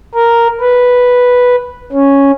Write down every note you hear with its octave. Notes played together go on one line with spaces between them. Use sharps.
A#4
B4
C#4